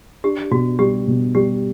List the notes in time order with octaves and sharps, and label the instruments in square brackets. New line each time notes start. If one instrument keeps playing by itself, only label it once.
[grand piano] D4 [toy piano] G4
[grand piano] B2 [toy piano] F#4
[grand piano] G3 [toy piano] G4
[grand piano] B2
[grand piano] G3 [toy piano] G4